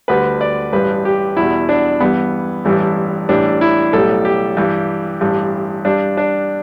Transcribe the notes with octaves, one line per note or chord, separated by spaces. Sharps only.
D2 D3 G3 B4
D5
A1 G2 G3 B4
G4
E2 B2 G3 E4
D4
G2 E3 G3 B3
A1 G2 E3 G3
A1 A2 E3 G3 D4
E4
B1 A2 G3 A4
G4
G2 E3 G3
A1 G2 E3 G3
G2 G3 D4
D4